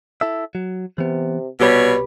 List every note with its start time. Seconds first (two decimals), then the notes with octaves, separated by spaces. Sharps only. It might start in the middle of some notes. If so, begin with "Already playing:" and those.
0.21 E4 A4 E5
0.55 F#3
0.98 C3 E3 B3
1.60 C2 B2 G3 G4 B4 C#5 B5